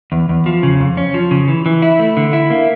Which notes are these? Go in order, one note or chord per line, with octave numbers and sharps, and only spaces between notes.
E2
E2
F3
C#3
F2
C#4
F3
C#3
E3
E3
E4
A3
D3
E4
A#3